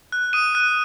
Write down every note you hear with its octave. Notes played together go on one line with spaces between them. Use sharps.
F#6
D#6 D#7
F#6